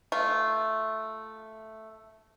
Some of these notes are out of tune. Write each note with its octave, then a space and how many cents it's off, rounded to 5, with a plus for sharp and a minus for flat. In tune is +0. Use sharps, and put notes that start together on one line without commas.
A3 +0 F4 -10